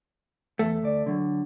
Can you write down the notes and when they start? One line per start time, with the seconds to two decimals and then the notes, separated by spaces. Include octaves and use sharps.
0.59 E2 A3
0.83 D2 D5
1.06 D3 F#3